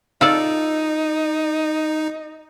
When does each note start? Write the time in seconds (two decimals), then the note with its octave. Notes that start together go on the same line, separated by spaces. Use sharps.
0.21 D#4 F4 A4 D5 D#5